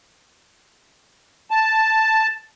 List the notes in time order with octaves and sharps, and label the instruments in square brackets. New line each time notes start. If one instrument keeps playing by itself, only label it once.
[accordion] A5